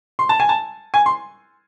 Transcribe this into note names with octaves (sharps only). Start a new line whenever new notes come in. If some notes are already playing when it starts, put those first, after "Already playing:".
C6
A5
G#5
A5
G#5
C6